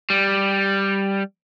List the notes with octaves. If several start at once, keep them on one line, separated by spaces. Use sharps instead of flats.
G3